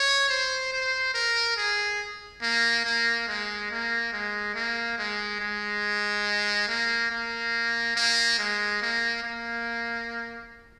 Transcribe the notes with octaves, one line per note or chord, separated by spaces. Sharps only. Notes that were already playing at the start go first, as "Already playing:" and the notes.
Already playing: C#5
C5
C5
A#4
G#4
A#3
A#3
G#3
A#3
G#3
A#3
G#3
G#3
A#3
A#3
A#3
G#3
A#3
A#3